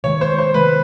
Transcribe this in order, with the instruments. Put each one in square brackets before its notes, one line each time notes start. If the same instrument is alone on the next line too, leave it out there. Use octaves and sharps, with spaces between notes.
[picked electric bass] C3 D#3 G#3 [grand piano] C#5
[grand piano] C5
C5
[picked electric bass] C3 D#3 G#3 [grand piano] B4